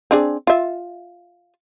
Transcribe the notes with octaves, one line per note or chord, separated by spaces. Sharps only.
C4 D4 G#4
F4 E5